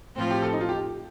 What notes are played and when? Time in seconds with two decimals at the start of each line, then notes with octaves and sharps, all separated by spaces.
0.15 A2 F3 C4 F4
0.31 G4
0.42 A4
0.53 D#4
0.61 F4
0.69 G4